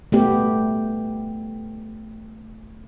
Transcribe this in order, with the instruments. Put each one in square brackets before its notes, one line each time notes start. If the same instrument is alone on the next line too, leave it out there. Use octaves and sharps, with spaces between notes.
[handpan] A3 B3 G4